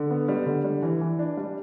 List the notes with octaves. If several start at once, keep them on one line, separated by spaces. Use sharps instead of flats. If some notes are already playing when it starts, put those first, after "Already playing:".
Already playing: D3
B3
G3
D3
G3
E3
E3
D4
G3